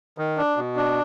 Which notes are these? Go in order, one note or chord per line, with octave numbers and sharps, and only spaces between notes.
D#3
D4
B2
D4